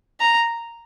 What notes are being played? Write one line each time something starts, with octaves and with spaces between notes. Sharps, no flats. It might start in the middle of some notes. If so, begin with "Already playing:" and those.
A#5